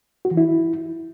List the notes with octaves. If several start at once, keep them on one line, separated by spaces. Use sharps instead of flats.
F#4
E3
E4